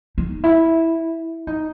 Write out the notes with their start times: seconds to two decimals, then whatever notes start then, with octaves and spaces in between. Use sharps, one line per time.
0.18 D#4
0.44 E4
1.47 D#4